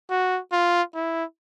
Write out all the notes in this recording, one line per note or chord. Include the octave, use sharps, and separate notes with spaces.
F#4
F4
E4